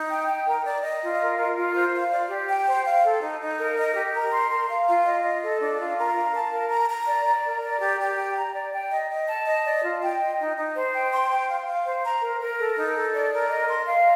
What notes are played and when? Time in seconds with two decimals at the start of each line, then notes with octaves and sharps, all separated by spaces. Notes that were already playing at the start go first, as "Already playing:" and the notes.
Already playing: D#4
0.09 G5
0.27 G5
0.46 A#4
0.65 D5
0.83 D#5
1.01 F4
1.20 A#4
1.38 A#4
1.56 F4
1.75 C5
1.93 F5
2.11 D5
2.30 G4
2.49 G5
2.66 C5
2.85 F5
3.03 A4
3.21 D#4
3.40 D#4
3.58 A#4
3.77 D#5
3.95 G4
4.14 A#4
4.32 C6
4.51 A#4
4.68 F5
4.86 F4
5.05 D#5
5.23 D#5
5.42 A4
5.60 D4
5.78 F4
5.97 A#4
6.16 F5
6.34 A5
6.52 A#4
6.70 A#5
6.89 A#5
7.07 D5
7.26 D5
7.44 A#4
7.62 D5
7.80 G4
7.99 G4
8.18 G5
8.36 A#5
8.54 D5
8.73 G5
8.91 D#5
9.10 D#5
9.28 A5
9.45 D#5
9.65 D5
9.82 F4
10.02 G5
10.19 D#5
10.39 D#4
10.56 D#4
10.75 C5
10.93 G5
11.12 C6
11.30 G5
11.48 F5
11.66 F5
11.86 C5
12.04 A#5
12.21 A#4
12.40 A#4
12.58 A4
12.77 D#4
12.95 A4
13.13 D5
13.32 A#4
13.50 D#5
13.69 C6
13.87 F5